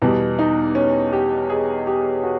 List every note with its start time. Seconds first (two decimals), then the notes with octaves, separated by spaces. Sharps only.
0.02 E2 B2 G3
0.39 D#4
0.75 C#4
1.13 G4
1.50 G#4
1.87 G4
2.23 F#4